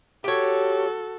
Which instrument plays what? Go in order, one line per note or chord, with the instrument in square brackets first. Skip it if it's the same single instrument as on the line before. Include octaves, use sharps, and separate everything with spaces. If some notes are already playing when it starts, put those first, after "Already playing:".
[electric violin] F#4 A4 [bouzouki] G4 C#5